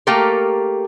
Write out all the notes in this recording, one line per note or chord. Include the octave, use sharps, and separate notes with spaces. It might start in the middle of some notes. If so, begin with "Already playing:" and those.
A3 A#3 G4 A4 A#4